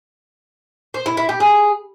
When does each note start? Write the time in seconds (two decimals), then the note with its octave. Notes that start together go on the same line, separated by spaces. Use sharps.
0.94 C5
1.06 E4
1.17 E4
1.29 G4
1.40 G#4